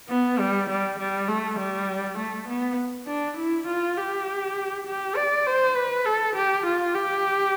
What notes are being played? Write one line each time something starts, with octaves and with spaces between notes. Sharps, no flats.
B3
G3
G3
G3
A3
G3
A3
B3
D4
E4
F4
G4
G4
D5
C5
B4
A4
G4
F4
G4